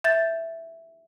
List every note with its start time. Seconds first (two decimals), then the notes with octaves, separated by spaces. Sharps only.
0.04 E5 G6 A6